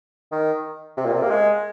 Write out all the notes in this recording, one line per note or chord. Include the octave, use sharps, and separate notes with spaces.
D#3
C3
A#2
C3
A#3
G#3